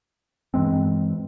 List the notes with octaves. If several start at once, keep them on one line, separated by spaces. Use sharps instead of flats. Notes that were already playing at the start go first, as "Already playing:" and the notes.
G2 E3 G#3 C4